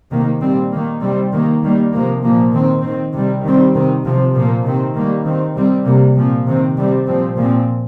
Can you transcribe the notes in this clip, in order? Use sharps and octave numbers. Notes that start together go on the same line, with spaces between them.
C3 D#3 A#3
A#2 G3 C4
D#3 A#3
C3 G3 C4
D#3 A#3
D#3 G3 A#3
C3 F3 A#3
A#2 F3 A#3
D#3 C4
D#3 C4
C3 G3 C4
D#3 G3 C4
C3 D#3 C4
C3 F3 C4
A#2 F3 A#3
C3 D#3 C4
D#3 G3 A#3
D#3 C4
C3 G3 C4
C3 G3 A#3
A#2 F3 C4
C3 D#3 C4
C3 G3 C4
A#2 F3 C4
A#2 F3 C4